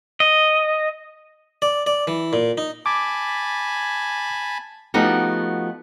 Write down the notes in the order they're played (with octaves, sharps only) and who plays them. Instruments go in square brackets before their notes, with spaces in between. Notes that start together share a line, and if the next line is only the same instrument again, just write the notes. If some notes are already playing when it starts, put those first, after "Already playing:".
[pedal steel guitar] D#5
[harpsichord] D5
D5
E3
A#2
D#4
[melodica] G#5 A5 B5 [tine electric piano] D6
[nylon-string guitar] F3 A3 B3 D#4 F#4 G4